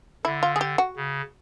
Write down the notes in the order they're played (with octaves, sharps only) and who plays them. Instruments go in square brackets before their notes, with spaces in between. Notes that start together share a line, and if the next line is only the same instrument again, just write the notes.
[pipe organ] D3 [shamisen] E4
[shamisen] F4
G#4
G4
F#4
[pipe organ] C#3